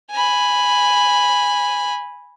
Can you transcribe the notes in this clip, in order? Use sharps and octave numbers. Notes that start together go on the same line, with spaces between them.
G#5 B5